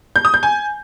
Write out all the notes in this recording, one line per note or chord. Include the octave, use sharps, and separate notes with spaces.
G6
D#6
G6
G#5